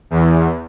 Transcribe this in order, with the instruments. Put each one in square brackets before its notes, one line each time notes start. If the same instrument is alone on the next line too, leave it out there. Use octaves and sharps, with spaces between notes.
[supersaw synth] E2